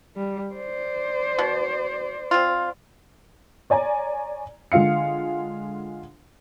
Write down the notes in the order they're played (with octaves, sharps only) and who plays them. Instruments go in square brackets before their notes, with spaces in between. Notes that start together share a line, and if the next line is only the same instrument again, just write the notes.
[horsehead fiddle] G3
C5 D5
[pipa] B2
C4 F4
[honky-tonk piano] C#5 D5 G#5 A#5
D3 G#3 F4 F5 C#7